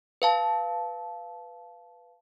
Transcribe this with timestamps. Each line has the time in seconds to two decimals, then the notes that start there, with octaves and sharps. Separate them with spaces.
0.22 B4 F5 A5